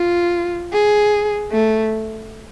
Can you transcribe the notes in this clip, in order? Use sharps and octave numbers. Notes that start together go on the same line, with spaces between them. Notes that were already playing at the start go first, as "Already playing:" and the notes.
Already playing: F4
G#4
A3